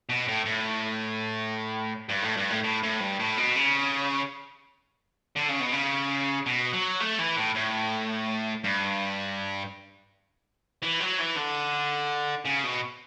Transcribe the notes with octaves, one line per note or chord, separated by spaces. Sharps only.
B2
A2
A2
G2
A2
G2
A2
A2
A2
G2
A2
B2
C#3
D3
C#3
B2
C#3
B2
F#3
A3
E3
A2
A2
G2
E3
F#3
E3
D3
C#3
B2